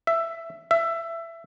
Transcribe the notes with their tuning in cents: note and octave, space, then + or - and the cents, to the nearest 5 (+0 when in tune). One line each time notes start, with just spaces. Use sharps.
E5 +15
E5 +20